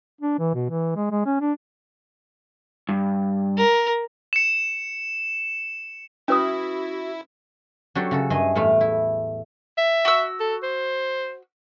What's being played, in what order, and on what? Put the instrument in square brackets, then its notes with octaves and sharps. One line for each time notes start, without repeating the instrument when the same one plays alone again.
[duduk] D4
E3
B2
E3
G#3
G#3
C#4
D4
[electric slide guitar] G2
[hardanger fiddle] A#4
[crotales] C#7 E7
[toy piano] C#4 B4 D#6 [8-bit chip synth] E4 [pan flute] F#4
[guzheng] F#3 D4 F#4 G4 A4
C#3 F#4 A4
G2 A3 G#4 D#5 G#5
E2 A2 A3 F5
E4
[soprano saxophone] E5
[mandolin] F#4 E6
[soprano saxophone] A4
C5